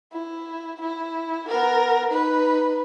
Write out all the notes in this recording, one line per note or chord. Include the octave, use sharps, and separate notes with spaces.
E4
E4
B3 A#4
D#4 B4